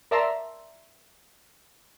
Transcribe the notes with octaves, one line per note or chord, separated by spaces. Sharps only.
A#4 D5 E5 A5 A#5 C6